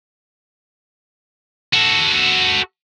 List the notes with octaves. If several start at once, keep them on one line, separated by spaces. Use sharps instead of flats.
F#4 A4